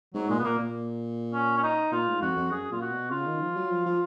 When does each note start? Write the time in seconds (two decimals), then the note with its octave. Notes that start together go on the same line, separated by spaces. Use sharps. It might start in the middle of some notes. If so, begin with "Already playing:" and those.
0.14 G#2 F#3
0.29 A#2 G#3
0.39 B3
0.44 A#2 A#3
0.59 A#2
1.33 C#4
1.57 C#4
1.63 D#4
1.92 A#2 F4
2.08 G#2
2.22 F2 F#4
2.37 F2
2.51 F#2 G#4
2.71 A#2 F4
2.81 F#4
2.91 B2
3.10 C#3 F4
3.26 D#3
3.41 F3
3.56 F#3
3.71 F3
3.86 F3